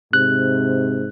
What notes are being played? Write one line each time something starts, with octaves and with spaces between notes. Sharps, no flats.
G#2 C3 F#6